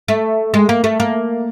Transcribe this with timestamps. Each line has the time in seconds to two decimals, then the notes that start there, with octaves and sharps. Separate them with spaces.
0.08 A3
0.54 G#3
0.69 A#3
0.84 A3
1.00 A#3